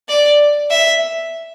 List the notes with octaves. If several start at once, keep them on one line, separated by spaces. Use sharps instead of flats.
D5
E5